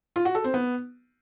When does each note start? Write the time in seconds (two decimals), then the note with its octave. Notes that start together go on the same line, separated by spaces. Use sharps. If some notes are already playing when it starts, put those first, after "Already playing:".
0.16 F4
0.25 F#4
0.35 A4
0.44 C4
0.54 B3